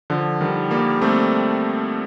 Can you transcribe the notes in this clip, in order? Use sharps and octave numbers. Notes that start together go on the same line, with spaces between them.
D3 F3
D#3 G3
G3 A#3
A3 C4